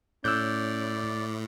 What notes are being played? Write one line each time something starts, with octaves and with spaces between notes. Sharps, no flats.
A2 C#4 D5 E6 F#6 G6